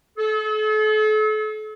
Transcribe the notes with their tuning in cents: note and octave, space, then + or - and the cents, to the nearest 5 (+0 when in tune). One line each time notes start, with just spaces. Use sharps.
A4 -40